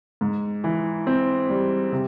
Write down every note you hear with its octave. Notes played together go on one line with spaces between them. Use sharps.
G#2
E3
C4
G3
C3